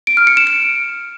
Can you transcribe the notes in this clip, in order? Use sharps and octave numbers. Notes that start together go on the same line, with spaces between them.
D7
F6
C#7
E7
D7